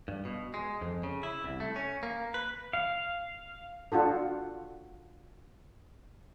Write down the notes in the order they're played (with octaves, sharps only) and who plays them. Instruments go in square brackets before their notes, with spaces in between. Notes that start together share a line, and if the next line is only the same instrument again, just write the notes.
[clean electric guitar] G2
B2
G#3
F2
C#3
E4
C2
A3
C#4
A#3
B4
[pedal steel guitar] F5
[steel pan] D4 F4 F#4 A4